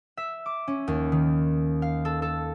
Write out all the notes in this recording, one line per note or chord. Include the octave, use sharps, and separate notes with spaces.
E5
D6
C#4
D#2
D#3
F5
A4
A4